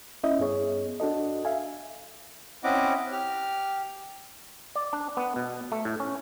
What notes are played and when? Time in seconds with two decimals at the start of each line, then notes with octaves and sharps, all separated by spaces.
0.23 C#4 E4 D#5 E5
0.39 G2 B3 G#4 C#5
1.00 D4 F#4 A4 D#5
1.45 E5 F5 G#5
2.64 C4 C#4 E4 D#5 F#5 D6
3.12 G4 F6
4.75 D5
4.93 D4
5.17 B3
5.36 B2
5.72 A3
5.85 A2
6.00 C#4